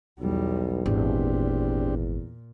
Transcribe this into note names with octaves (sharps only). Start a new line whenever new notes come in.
B1 E2 G3
G#1 E2 A#2 C4 D4 G4